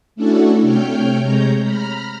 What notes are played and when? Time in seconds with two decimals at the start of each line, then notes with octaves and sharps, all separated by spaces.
0.16 A3 C#4 D4 E4 F#4 A4
0.61 C3 A3 C#5 G5 F6 G6
1.21 C3 G#3 C#5 A#5 G6
1.61 A#5 B5 F6